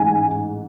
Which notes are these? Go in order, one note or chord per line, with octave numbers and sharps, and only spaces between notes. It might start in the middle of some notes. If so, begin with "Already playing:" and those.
Already playing: A1 G#2 G#5